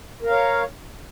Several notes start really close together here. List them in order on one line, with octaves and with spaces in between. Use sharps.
A#4 F5 C#5